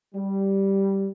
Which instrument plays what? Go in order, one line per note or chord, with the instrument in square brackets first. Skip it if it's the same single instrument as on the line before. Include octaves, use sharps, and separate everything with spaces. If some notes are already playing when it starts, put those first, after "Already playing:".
[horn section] G3